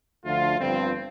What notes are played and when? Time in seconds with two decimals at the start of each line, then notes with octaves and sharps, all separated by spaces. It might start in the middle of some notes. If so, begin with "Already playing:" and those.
0.25 D2 D3 F3 A3 F4
0.59 G1 G2 D3 F3 C4